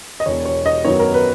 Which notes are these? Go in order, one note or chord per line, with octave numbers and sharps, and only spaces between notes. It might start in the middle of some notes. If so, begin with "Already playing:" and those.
D#5
E1 E2 B2 C#5
C#5
D#5
F#2 D#3 F#3 B3 D#4 C#5
A#4
B4